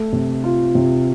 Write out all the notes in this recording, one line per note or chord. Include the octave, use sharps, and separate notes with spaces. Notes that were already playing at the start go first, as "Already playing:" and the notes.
Already playing: A3
C3
F4
C3